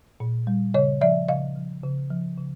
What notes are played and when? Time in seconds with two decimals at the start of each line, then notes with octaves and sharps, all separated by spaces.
0.20 A#2
0.47 G3
0.74 C#3 C#5 D#5
1.01 F3 D5 E5
1.29 C#3 D#5 F5
1.56 F3
1.83 C#3
2.10 F3
2.38 C#3